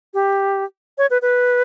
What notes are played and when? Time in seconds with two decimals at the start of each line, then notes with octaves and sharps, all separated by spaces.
0.14 G4
0.98 C#5
1.10 B4
1.22 B4